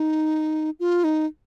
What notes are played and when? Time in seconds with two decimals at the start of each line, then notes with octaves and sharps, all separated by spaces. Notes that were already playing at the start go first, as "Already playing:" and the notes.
Already playing: D#4
0.80 F4
1.04 D#4